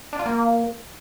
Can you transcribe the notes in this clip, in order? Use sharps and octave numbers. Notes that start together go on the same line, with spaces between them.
D4
F4
A#3